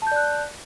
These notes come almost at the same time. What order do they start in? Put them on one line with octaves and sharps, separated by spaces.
A5 G6 D5 F#6